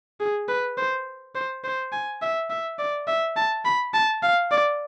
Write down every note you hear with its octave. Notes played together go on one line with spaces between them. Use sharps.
G#4
B4
C5
C5
C5
G#5
E5
E5
D5
E5
A5
B5
A5
F5
D5